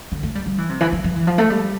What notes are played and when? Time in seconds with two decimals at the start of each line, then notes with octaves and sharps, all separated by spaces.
0.12 D3
0.23 A3
0.35 G3
0.46 G3
0.58 E3
0.69 C3
0.81 E3
0.92 F3
1.04 F3
1.16 E3
1.27 F3
1.38 A3
1.50 G3